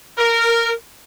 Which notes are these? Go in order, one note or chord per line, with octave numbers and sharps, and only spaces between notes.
A#4